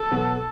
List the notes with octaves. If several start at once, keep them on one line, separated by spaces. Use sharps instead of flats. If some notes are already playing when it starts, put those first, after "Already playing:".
Already playing: A4
B2 F#3 B3